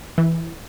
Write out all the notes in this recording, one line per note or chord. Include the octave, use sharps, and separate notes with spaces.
E3